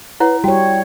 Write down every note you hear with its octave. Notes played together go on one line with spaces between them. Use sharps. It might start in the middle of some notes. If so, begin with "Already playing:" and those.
E4 B4 C#5 F#5
G3 F#4 C#5 G5